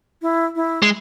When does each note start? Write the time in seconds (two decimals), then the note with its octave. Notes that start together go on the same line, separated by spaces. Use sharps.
0.22 E4
0.56 E4
0.82 G#3